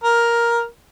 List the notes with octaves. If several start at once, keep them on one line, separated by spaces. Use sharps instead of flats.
A#4